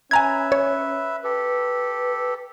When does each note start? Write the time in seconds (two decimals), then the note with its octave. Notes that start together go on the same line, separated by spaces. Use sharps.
0.11 C#4 B4 E5 G#5 A#5 G#6
0.52 C#5
1.24 G4 A4 B4